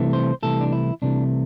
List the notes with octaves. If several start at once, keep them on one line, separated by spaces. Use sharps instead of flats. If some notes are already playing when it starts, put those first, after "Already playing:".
Already playing: C2 C3 E3 A3
C5
C2 C3 E3 A3 A4
D4
E4
C2 C3 E3 A3 D4